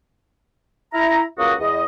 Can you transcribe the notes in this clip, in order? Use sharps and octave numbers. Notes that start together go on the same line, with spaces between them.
E4 A#5
C#2 A#3 F#4 D#6
E2 D#5